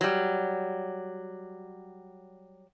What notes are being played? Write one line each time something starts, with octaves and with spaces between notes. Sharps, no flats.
F#3 G3